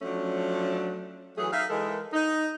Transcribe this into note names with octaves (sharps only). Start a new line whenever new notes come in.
F3 F#3 A3 C#4 D4
E3 F#3 A3 G#4
D#4 E5 F5
E3 G#3 A4 A#4
D#4